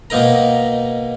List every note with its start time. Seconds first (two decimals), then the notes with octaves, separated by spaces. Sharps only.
0.10 B2 A#3 D#4 A#4 A#5